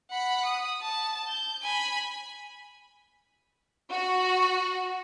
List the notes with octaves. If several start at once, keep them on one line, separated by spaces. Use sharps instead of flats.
F#5 B5
D#6
A5
G6
G#5 B5
F#4